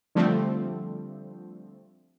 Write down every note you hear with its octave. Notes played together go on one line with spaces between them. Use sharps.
D3 F3 G3 A3 C4